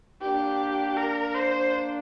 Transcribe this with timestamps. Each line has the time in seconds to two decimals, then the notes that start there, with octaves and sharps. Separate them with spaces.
0.21 A#3 D4 G4
0.97 A#4
1.35 C5